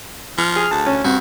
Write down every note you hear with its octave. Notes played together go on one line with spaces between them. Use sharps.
F3 F6
G#4
D2 A5
C#4
G2 C4 F#4